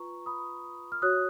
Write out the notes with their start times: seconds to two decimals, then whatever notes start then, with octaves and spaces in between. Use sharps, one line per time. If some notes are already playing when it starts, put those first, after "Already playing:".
Already playing: F4 B4 A#5 C#6
0.26 B5 D#6
0.92 F6
1.02 F#4 C#5 D#6 F#6